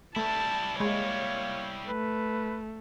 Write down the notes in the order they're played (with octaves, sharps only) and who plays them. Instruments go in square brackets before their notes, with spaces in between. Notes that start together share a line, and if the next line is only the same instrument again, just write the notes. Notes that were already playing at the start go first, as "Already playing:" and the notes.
[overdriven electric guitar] G3 E4 [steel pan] A3 [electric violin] A5
[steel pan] G#3 [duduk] A#3 [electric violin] C#5
[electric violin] A3 [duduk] B4